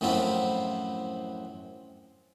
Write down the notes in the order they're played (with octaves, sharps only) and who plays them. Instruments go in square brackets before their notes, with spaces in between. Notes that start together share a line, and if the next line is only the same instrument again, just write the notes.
[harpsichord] F#2 A2 F3 F#3 C4 E4